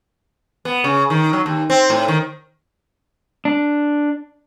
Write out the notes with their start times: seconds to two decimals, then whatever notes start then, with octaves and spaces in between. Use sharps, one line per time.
0.65 B3
0.84 C#3
1.10 D#3
1.33 F#3
1.46 D#2
1.70 C4
1.90 A2
2.08 D#3
3.45 D4